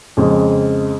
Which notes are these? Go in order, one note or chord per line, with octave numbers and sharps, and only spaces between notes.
F2 C#3 G#3